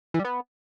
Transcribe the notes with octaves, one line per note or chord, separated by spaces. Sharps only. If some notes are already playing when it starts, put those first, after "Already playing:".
E3
G3
B3